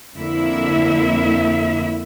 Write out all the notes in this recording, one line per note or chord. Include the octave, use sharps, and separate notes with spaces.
F2 D3 A#3 E4 E5